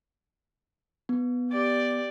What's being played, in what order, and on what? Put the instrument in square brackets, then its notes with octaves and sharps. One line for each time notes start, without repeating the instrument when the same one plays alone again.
[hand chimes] B3
[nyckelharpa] G4 D5